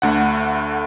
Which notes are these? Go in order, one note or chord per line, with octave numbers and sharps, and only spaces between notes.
D2 D3 A3 F#5